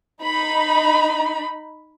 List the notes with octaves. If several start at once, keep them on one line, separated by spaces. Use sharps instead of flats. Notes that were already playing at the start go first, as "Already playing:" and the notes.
D#4 B5